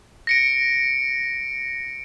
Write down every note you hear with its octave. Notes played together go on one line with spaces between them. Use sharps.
A#6 C#7 D7